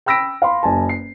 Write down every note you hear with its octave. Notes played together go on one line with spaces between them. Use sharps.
G5 B5 E6 A#6 B6 D7
F5 B5 C6
F#1 G#5 A5
C7